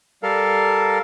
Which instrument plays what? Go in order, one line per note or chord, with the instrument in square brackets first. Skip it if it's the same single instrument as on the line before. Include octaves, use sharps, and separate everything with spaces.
[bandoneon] G3 A4 A#4 F5